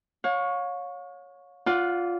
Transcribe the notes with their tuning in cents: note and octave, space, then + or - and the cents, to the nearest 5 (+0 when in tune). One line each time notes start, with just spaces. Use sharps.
C#5 +0 F5 +40
F4 +5 D5 -30 F#5 -10